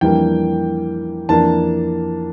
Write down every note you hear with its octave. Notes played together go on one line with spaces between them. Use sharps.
F2 E3 G3 A#3 D4 G5
F2 E3 A#3 D4 A5